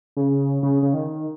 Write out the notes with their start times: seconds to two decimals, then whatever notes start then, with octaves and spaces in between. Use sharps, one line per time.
0.17 C#3
0.63 C#3
0.82 C#3
0.93 D#3